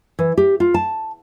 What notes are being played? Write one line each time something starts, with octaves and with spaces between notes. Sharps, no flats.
E3
G4
F4
A5